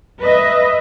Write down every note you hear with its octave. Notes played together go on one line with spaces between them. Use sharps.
B4 D#5 E5